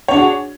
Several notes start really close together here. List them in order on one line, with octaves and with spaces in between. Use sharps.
C#5 D4 G#4 F#4